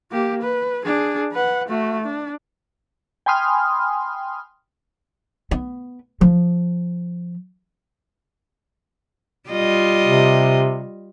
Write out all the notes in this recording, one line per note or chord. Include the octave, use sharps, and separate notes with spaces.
A#3 G4
B4
D4 G#4
B4 F#5
A3 F#4
D4
G5 G#5 B5 C6 D#6 F6
B3
F3
G3 F4 D#5
C3